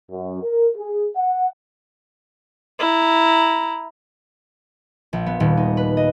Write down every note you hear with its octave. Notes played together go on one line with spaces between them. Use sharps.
F#2
A#4
G#4
F#5
E4 A#5
A#1
B3
D#1
D#4
B4
D#5